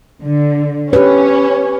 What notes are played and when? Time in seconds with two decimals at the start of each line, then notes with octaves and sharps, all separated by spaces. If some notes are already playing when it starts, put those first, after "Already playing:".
0.23 D3
0.93 C#4 G4 B4